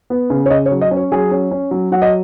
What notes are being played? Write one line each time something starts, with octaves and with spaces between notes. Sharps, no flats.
B3
C#3
C#5
C#3 D#5
C#5
F#3
D#5
C#4
C#5
F#3 G#4
C#4
C#4
F#3
F#3 F#5
D#5